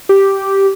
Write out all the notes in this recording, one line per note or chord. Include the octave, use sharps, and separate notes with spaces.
G4